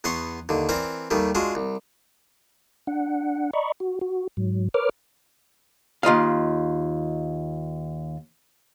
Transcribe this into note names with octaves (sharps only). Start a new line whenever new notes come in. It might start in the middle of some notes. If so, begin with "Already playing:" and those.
E2 B3 F#5 C6 C#6
D#2 D3
E3 C4 A#4 D5
D#2 D#3 G3 A3
G#3 D4 F4 F#4
C2
D4 F#5
D5 D#5 A#5 B5 C#6
F#4
F#4
G#2 F#3
A#4 B4 C#5 D6 F6
D#2 F4 D#5 F5